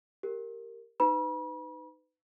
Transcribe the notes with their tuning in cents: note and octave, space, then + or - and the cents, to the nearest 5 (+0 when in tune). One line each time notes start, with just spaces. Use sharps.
G4 +0 A#4 -10
D#4 +0 B4 +30 B5 -40